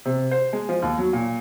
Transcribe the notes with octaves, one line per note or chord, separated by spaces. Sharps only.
C3
C5
G#3
F3
D#2
F#3
A#2